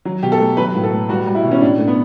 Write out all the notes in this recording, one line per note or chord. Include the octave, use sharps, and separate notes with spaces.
F#3
B2 G4
A4
A3
F#3 B4
A2
A4
A3
G3 F#4
G3
E4
B2
C#4
A2 D4
A3
B3